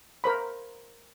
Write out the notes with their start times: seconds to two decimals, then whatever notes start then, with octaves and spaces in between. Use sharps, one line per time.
0.24 A#4 C5 B5